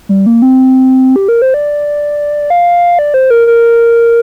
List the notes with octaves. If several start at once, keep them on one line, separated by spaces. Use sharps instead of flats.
G3
A#3
C4
G4
A#4
C5
D5
F5
D5
C5
A#4
A#4